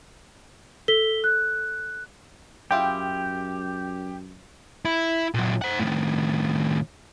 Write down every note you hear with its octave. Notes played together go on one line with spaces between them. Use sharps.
A4 B6 G7
F#6
F#2 E4 F4 G4 G#4 G5
E4
A#2 F#3
C5 F#5
A2 D#3